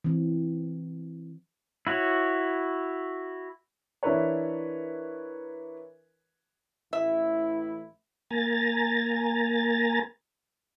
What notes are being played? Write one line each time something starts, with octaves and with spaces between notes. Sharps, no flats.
E3 C4
E4 F#4 C#5
E3 D4 E4 A#4 B4 C#5
A1 E4 E5
A#3 G#5 A#5 A6